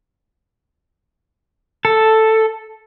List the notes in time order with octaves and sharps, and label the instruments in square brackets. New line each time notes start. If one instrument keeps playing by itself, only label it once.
[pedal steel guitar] A4